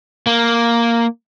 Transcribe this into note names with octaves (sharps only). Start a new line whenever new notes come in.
A#3